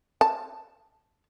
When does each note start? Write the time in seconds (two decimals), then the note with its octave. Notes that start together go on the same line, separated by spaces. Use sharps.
0.21 A5